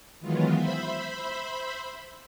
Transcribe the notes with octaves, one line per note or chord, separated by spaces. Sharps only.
D#3 E3 F#3 G#3 B3 F4
C5 E5 B5